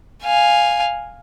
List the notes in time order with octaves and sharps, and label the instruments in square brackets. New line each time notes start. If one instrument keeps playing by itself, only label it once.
[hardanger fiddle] F5 G#5